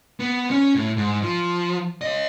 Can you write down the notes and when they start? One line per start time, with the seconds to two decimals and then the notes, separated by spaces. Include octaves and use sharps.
0.20 B3
0.50 C#4
0.75 A2
0.97 G#2
1.22 F3
2.01 C#5 D#5